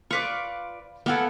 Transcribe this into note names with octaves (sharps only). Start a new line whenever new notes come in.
F4 B4 D5 C#6
A#3 B3 A4 F#5 G#5